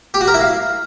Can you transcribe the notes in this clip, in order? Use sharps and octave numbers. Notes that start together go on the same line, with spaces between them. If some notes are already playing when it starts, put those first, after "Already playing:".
G4
F#4
A#4
E4
F5